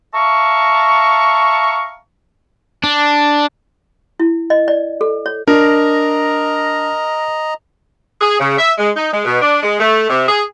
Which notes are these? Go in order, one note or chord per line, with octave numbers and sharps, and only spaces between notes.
E5 F5 A5 A#5 C#6
D4
E4
D#5
D5
A4
C#5
D4 A#4 D#5 A#5
G#4
C#3
E5
G#3
D#4
G#3
B2
D4
G#3
A3
C3
G#4